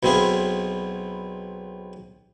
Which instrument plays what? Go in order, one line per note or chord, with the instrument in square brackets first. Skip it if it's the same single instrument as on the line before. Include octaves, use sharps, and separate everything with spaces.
[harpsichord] B1 B2 C4 E4 G#4 F5